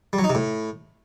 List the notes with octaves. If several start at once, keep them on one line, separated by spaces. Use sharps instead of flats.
G3
F#3
D#4
C3
A2